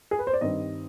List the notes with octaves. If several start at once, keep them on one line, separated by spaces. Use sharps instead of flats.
G#4
B4
C5
D5
G2 D#3 G3 C4 D#5